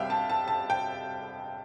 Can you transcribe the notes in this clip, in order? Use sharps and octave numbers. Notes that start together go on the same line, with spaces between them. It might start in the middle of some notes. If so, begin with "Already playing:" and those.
Already playing: C2 C3 G3 E5 F5 G5
A5
A5
A5
G5